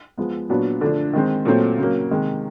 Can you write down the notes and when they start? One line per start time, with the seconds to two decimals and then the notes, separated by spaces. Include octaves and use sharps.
0.18 F3 G#3 B3
0.49 A#2 F#3 B3 D4 F#4
0.81 D3 F3 A3 D4
1.13 D#3 G#3 C4
1.45 A#2 F#3 A3 C4
1.78 C#3 F#3 A#3
2.11 C3 D#3 G#3